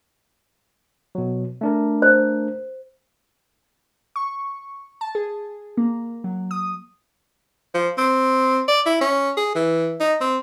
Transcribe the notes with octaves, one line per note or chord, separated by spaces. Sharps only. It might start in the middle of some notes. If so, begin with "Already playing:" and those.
B2 F#3
A3 D4 A#4
C5
C#6
A5
G#4
A#3
F#3
D#6
F3
C4
D5
E4
C#4
G#4
E3
D#4
C4